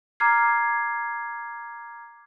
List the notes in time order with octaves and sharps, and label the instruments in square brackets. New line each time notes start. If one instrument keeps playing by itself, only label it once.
[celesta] A#5 D6 F6 G#6 C7